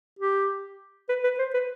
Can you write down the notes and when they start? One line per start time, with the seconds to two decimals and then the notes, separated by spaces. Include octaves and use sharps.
0.19 G4
1.09 B4
1.24 B4
1.39 C5
1.54 B4